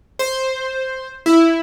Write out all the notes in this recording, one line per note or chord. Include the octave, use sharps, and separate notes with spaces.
C5
E4